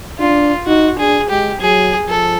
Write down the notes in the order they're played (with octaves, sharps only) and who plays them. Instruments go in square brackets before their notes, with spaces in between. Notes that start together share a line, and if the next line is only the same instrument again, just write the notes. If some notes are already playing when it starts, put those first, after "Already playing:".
[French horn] D4 [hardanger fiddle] F4
[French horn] D#4 [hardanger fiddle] F#4
[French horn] D4 [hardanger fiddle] G#4
[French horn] G#3 [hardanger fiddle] G4
[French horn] F#3 [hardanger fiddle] G#4
[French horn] F3 [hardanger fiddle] A4